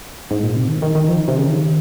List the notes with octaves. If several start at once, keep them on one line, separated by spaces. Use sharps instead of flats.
G#2
A#2
C3
D#3
D#3
D#3
F3
D#3
C3
C#3
D#3